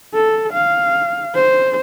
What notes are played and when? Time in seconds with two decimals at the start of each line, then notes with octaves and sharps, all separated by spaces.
0.14 A4
0.52 F5
1.35 C5